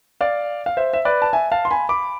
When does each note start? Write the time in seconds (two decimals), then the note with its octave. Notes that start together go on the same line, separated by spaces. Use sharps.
0.21 D5 F5
0.66 F5
0.77 C5 E5
0.93 E5
1.05 B4 D5
1.22 A5
1.33 E5 G#5
1.52 F5 A5
1.65 C6
1.71 G#5 B5
1.89 B5 D6